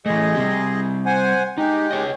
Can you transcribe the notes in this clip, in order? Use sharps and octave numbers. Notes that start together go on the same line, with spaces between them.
E3 A3 G#4 D#5
G3 C4 G4
C5 F#5 G#5
G#3 D#4 G4
G#4 C#5 D#5